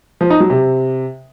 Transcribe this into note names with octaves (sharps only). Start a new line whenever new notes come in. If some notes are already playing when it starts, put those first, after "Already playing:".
F3
D#4
F#3
C3